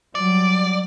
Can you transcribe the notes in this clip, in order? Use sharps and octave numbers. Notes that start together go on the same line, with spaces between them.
F#3 G3 D5